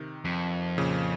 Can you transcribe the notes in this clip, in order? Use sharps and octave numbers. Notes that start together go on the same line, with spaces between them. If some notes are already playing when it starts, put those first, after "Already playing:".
Already playing: C3 D#3
F2
A#2 C#3